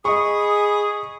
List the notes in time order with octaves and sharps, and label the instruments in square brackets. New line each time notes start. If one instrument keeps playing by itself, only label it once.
[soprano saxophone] G#4 [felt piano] D#5 C#6 [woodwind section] B5 D#6